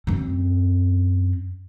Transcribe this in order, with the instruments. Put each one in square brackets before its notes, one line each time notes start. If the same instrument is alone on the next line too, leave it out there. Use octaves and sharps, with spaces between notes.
[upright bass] F#2 C4